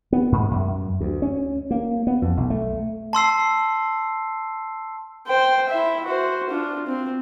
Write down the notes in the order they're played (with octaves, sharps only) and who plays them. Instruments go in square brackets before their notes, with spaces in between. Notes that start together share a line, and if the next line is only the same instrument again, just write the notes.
[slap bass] B3
G#2
F#2
D2
C#4
A#3
B3
F2
B1
A3
[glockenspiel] A5 C6 E6 C7
[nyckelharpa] C5 G5
E4 E5
F#4 C5
D4 F4
C4